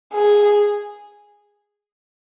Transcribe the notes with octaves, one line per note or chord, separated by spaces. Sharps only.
G#4